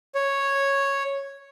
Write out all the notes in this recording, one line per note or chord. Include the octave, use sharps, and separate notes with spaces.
C#5